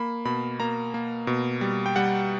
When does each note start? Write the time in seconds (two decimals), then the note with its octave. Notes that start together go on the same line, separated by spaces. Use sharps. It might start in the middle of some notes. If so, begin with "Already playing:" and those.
Already playing: A#3 B5
0.25 B2 B5
0.60 A#3 A#5
0.94 A#3
1.27 B2
1.61 G3
1.86 G5
1.96 G3 F#5